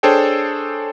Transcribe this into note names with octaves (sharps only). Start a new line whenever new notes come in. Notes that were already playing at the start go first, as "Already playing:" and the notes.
D4 G#4 A4 C5 C#5 G5